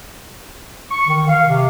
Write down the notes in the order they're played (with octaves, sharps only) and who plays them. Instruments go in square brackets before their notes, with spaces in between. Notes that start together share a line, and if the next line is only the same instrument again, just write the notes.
[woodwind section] C#6
D#3
F5
C3